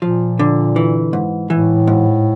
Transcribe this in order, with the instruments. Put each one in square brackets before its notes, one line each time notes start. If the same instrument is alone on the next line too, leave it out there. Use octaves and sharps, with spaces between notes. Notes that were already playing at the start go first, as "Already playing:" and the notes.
[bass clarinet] A#2 [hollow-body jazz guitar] F3
[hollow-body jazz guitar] D3
E3
G#2
[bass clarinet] A2 [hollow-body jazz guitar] E3
[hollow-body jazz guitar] G#2